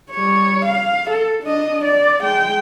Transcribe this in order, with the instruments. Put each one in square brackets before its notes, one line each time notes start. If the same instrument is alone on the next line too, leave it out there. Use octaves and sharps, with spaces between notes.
[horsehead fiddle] G3 C#5
F5
A4
D4 D#5
D5
G#3 G5